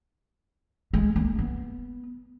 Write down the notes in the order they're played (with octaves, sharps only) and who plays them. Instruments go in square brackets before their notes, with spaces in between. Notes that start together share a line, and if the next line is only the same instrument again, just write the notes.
[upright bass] G#3
A#3
B3